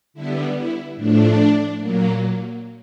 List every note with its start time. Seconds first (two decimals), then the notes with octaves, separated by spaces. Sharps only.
0.14 D3 G3 B3 E4
0.55 E4
0.96 A2 F3 A3 D4
1.79 A#2 F#3 A#3